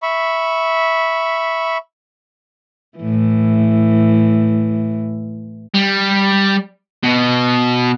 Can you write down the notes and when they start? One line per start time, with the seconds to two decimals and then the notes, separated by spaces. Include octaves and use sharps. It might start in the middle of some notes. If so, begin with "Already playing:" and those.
0.02 E5 B5 C#6
2.99 A2 E3
5.74 G3
7.03 B2